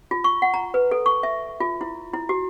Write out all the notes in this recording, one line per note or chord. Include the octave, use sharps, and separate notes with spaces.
F4
C#6
F#5
A#5
B4
A4
C#6
E5
F4
E4
E4
F#4